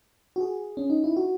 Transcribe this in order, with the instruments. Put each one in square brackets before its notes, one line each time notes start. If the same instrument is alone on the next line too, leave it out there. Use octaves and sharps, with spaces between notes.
[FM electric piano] F#4
G#4
C#4
D#4
E4
F#4